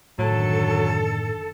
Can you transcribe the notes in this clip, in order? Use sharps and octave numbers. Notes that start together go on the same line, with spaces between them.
F#1 A2 D3 D#3 F#3 A4